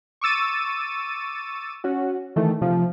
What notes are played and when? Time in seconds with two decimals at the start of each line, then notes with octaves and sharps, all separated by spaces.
0.21 C#6 D6 E6 A6 D#7
1.84 C#4 F#4
2.36 D#3 E3 A3
2.61 C3 F3